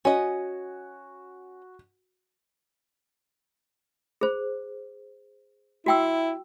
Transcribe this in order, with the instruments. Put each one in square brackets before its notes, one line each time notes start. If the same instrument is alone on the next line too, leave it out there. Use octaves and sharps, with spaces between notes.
[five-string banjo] C#4 D#5 [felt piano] F#4
[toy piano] G#4 C5
[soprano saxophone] E4 [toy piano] F#4 G5 E6